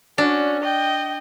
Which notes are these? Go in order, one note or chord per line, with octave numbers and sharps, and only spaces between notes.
C#4 D4 F#4
D#5 G5